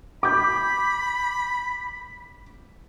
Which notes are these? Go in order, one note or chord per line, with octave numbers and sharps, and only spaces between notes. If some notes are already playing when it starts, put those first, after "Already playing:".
B5 D6 G6